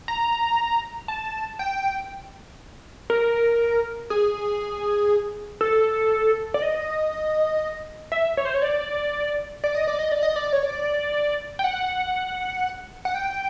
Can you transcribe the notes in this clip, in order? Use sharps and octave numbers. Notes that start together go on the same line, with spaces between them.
A#5
A5
G5
A#4
G#4
A4
D5
D#5
E5
C#5
C5
C#5
D5
D5
D#5
D5
D#5
D5
D#5
D5
C#5
D5
G5
F#5
F#5
G5